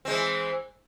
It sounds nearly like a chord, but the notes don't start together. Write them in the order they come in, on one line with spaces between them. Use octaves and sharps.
C4 G#3 E3